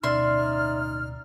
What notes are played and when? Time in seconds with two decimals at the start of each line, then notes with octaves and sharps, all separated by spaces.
0.03 D1 B2 C#4 D#4 D5 E5 C6 F6